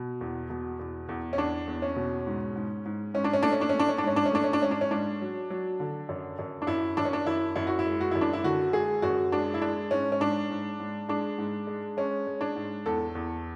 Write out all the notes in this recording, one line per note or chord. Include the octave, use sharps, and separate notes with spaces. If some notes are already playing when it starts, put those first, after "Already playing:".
Already playing: B2
E2
B2
E2
E2
C#4
E2 D4
E2
C#4
B2
G#2
G#2
G#2
G#2 C#4
D4
C#4
A3 D4
C#4
D4
C#4
A3
D4
C#4
D4
G#2 C#4
D4
C#4
A3 D4
C#4
D4
G#2 C#4
D4
C#4
G#2 D4
F#3
F#3
D3
F#2
F#2
D4
F#2 E4
F#2 D4
C#4
D4
F#2 E4
F#2 E4
F#4
E4
G#3
F#4
F#2 E4
D4
E4
D3 F#4
G#3 G#4
F#2 F#4
G#3 D4
E4
G#3 D4
G#2 C#4
C#4
G#2 D4
G#2
G#2
G#3 D4
G#2
G#3
G#3 C#4
G#3
D4
G#2
E2 A4
E2